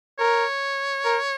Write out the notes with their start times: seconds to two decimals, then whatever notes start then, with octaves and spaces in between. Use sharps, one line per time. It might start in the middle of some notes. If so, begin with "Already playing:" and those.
0.19 A#4 C#5
1.05 A#4